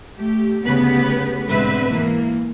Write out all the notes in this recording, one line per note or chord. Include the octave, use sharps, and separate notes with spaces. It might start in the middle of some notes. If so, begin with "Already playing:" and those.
A3 G4
D2 C#3 B3 G4 B4
G#2 B2 D3 C4 B4 E5
E3 A#3